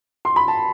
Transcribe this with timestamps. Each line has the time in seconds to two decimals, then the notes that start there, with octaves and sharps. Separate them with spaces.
0.25 C6
0.36 B5
0.48 A5